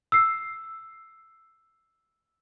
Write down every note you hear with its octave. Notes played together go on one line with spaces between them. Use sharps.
E6 C7